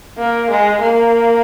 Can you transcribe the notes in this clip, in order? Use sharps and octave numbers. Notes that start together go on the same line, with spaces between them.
A#3
G#3
A#3